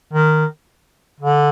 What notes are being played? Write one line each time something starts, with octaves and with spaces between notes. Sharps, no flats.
D#3
D3